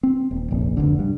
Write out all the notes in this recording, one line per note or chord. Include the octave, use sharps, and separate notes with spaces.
C4
D#1
F1 A#1
F1 D2 D3
G2